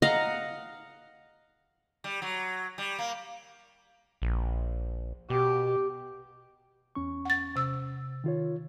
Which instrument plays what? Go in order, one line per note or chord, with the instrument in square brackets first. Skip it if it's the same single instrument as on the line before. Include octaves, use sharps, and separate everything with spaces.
[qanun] D#5 F5 F#5 A#5
[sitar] G3
F#3
G3
A#3
[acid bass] A#1
[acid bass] B2 [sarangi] G4
[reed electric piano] E2 C#4 C#6
[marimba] F#5 A6
C3 E6
[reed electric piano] D#3 F4 C#5